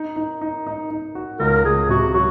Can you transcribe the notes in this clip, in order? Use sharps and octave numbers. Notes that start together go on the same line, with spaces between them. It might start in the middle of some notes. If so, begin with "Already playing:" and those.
Already playing: D#4
D#4
D#4
D#4
D#4
F#4
C#2 A#4
C#2 G#4
C3 F#4
F#3 F#4